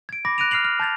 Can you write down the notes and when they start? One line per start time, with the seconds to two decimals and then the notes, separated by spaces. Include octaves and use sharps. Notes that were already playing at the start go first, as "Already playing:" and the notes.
0.09 G#6 D7
0.25 B5 D6 A#6
0.38 F#6 A#6 D7 D#7 F7
0.51 F6 F#6 C7 F7 F#7
0.65 F6
0.80 A5 G6 A6 F7